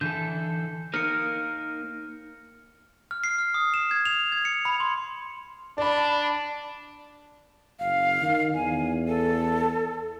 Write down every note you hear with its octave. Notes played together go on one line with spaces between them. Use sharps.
D3 E3 A4 G6
A#3 D#4 A#4 F6 C#7
F6
C7
F6
D#6
E7
G#6
F7
G#6
C#7
B5
C6
D4 D5 B5
F#1 F5
D#3
E2 G#5
A4